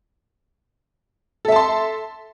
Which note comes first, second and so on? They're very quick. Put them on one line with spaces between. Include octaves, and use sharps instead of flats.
A4 E5 A5 C6